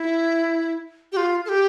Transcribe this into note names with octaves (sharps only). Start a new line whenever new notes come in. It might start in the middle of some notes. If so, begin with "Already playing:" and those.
Already playing: E4
G4
F4
A4
G4